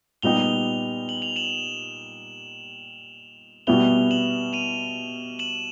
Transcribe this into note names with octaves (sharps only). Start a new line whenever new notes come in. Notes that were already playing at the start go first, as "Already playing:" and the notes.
A#2 G3 B3 D#4 G4 F7 G7
F#7
F7
E7 F#7
B2 G3 B3 E4 F7 G7
E7 F#7
D#7 F7
E7 F#7